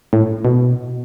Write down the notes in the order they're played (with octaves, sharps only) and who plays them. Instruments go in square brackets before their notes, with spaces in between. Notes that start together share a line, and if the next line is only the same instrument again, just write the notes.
[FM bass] A2
B2